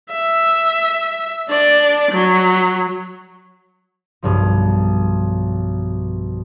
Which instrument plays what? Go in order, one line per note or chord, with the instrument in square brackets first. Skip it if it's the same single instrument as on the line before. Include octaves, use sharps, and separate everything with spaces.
[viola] E5
D4 D5
F#3
[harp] B1 G2 F3